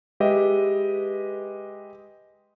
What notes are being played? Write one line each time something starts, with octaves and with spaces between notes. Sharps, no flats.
G#3 G4 B4 D#5 E5